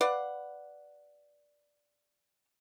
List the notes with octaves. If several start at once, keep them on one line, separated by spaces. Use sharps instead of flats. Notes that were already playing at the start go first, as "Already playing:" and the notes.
B4 D5 F5 F#5